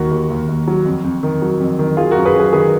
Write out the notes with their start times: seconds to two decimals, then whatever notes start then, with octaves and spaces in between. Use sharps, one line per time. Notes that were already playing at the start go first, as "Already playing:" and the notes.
Already playing: D#2 D#3 F#4 A#4
0.11 D#2
0.30 D#2
0.49 D#2
0.67 F#3
0.86 F2
1.04 F2
1.23 D#3
1.42 F#3
1.60 F2
1.79 D#3
1.97 F#3 F4 G#4
2.11 F#2 F#4 A#4
2.25 G#4 B4
2.34 F#2
2.40 G#4 B4
2.53 D#3 G#4 B4